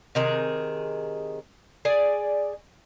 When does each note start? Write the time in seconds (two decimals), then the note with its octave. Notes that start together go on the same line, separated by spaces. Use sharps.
0.15 C3 D#3 G#4
1.85 G#4 D5 G#5